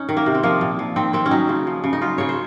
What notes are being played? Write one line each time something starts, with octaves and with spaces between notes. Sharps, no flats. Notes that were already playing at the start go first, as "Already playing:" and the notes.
Already playing: C#4 D#4
D#3
A#3
C3
C4
F3 A#3
A#2
F3
D#3 C4
D#3 C4
C#4
F#3 D#4
C#3
F3
C#3
D#4
F#3 F4
C#3 C#5
C5